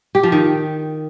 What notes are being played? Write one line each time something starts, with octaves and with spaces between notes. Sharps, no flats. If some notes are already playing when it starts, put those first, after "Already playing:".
G4
F3
D#3